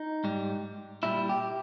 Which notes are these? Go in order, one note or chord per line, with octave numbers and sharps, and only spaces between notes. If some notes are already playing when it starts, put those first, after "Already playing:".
Already playing: D#4
G#2 G3
A#2 G3 E4
G4